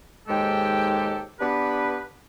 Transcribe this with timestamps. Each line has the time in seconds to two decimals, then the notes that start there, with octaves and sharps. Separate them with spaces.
0.28 D#2 G#2 G#3 G4 A4 G5
1.40 B3 D4 G4 B4